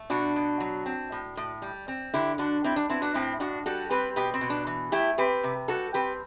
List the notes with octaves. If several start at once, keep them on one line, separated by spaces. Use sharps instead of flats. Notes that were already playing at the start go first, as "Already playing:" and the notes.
Already playing: A3
B2 D4 F#4
B2
F#3
C4
A2
A2
G3
C4
D3 E4 G4
D3 D4 F#4
G3 C4 E4
D4
B3 C4 E4
D4 F#4
A2 C4 E4
A2 D4 F#4
G3 F#4 A4
C4 G4 B4
B2 G4 B4
C4
B2
D4
E3
A3 E4 G4
C4 G4 B4
C3
G3 F#4 A4
C4 G4 B4